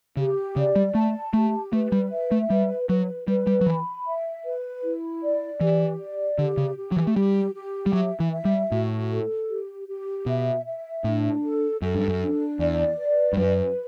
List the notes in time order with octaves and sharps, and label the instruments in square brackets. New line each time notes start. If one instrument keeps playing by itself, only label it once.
[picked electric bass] C#3 [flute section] G4
[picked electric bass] C#3 [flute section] D5
[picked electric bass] G3
[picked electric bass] A3 [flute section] A5
[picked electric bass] A3 [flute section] G4
[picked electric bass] A3 [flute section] B4
[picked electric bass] G3
[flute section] E5
[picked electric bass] A3
[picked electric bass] G3 [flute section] B4
[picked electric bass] F#3 [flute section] B4
[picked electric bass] G3 [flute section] B4
[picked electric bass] G3
F#3
[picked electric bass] E3 [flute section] B5
[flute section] E5
B4
E4
D5
[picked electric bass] E3 [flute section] G4
[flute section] D5
[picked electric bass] D3 [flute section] G4
[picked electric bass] C#3
[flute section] G4
[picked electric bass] F#3
E3
A3
[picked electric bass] G3 [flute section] G4
[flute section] G4
[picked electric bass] G3
[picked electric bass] F#3 [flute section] E5
[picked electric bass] E3
[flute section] E5
[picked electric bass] G3
[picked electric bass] A2 [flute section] F#4
[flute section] A4
G4
G4
[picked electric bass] B2 [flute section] E5
[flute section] E5
[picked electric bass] A2 [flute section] D4
[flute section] A4
[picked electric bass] F#2 [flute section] A4
[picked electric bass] G2
F#2
[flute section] D4
[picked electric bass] E2 [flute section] D5
[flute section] B4
[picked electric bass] G2
[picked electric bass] F#2 [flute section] B4